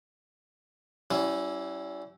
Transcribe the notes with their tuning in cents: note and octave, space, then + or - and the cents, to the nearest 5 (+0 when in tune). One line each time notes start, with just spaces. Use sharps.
G3 -35 C#4 +0 E4 +0